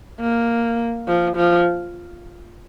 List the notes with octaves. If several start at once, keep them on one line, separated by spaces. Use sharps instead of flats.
A#3
F3
F3